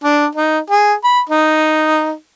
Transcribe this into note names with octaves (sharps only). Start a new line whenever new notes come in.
D4
D#4
G#4
B5
D#4